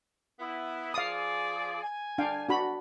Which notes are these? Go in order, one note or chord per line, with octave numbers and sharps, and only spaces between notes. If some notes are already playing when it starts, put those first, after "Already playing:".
B3 E4
F3 G#4 D5 F5 D#6
G#5
D4 F5 G5
D4 F#4 B5